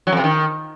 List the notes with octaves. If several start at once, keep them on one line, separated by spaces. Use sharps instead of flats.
F#3
F2
C3
D#3